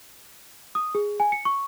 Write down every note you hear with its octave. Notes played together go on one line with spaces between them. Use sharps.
D#6
G#4
G#5
C#7
C#6